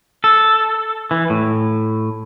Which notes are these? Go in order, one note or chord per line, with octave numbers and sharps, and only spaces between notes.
A4
E3
A2